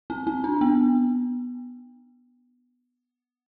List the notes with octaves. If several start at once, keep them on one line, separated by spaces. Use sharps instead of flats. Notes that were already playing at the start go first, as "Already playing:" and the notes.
C4
C4
D4
B3